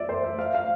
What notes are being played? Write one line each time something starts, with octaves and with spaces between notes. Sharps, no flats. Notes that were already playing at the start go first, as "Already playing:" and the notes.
Already playing: D5 E5
C5
E5
F5
F5